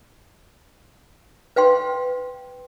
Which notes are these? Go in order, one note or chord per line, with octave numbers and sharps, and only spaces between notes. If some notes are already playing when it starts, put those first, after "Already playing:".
B4 F5 G5 C6